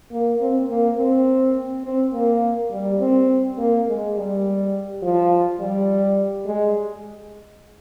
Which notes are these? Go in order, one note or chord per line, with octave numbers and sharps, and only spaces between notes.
A#3
C4
A#3
C4
C4
A#3
G3
C4
A#3
G#3
G3
F3
G3
G#3